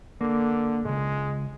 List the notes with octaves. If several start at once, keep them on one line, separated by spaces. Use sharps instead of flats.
D3 A#3
C#2 G#2 G#3